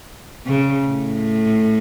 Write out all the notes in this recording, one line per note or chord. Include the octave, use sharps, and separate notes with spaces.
C#3
A2